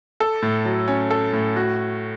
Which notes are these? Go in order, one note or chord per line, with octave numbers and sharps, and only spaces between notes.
A4
A2
F#3
C#4
A4
A2
F#4